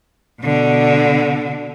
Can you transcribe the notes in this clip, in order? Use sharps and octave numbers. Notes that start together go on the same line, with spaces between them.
B2 D3